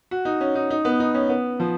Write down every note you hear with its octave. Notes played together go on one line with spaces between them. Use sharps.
F#4
D#4
C#4
D#4
D#4
B3
D#4
C#4
B3
F3